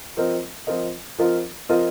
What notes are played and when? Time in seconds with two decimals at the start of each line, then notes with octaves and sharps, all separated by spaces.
0.17 F3 C4 F4 A#4 D#5
0.67 F3 C4 F4 A#4 D#5
1.18 F3 C4 F4 A#4 D#5
1.69 F3 C4 F4 A#4 D#5